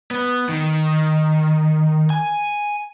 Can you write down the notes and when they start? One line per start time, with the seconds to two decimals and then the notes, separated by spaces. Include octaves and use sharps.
0.11 B3
0.49 D#3
2.10 G#5